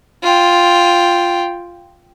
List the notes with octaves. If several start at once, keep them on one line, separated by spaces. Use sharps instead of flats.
F4 G5